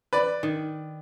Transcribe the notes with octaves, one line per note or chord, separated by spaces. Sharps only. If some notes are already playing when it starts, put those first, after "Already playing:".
B4 D5
D#3